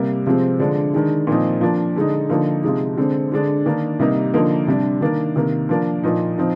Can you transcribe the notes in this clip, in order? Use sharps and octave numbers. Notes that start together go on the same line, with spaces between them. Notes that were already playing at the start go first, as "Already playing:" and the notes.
Already playing: C3 G3 A#3
C3 F3 G#3 C4
D3 F3 G#3 D4
D#3 G#3 D4
A#2 F3 C4 D#4
F3 A#3 D4
D3 G#3 D#4
D3 F3 A#3 D#4
C3 F3 G#3 D#4
D3 G#3 C4
D3 G#3 D4
D#3 A#3 D4
C3 G3 A#3 D#4
D3 F3 A#3 D#4
C3 G3 D4
D#3 A#3 D4
C3 D#3 A#3
F3 A#3 D4
A#2 F3 A#3 D#4
F3 C4 D#4